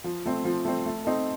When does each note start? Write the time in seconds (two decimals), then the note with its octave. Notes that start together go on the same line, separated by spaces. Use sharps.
0.04 F3
0.26 A3 C4
0.45 F3
0.65 A3 C4
0.85 A3
1.05 C4 D#4 A4